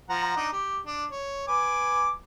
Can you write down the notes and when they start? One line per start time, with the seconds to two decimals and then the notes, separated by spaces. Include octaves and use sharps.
0.09 F3 F#5 A#5
0.36 D4 D#4
0.53 G4
0.86 D4
1.11 C#5
1.48 B4 G#5 D6